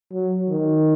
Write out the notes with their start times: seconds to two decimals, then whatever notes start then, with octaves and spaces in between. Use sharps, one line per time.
0.12 F#3
0.49 D#3